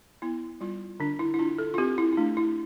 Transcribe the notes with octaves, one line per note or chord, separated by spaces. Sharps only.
B3 E4
G3 F4
D3 D4
E4
E4
D4 F4
A4
F4
C4 G4
E4
E4
A3 D4
E4